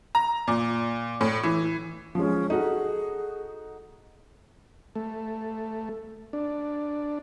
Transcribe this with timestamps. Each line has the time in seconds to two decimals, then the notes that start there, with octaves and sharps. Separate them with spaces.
0.15 A#5
0.48 A#2
1.21 A2
1.43 E3
2.15 F3 G#3 C#4
2.50 D#4 F#4 G#4 A4
4.95 A3
6.33 D4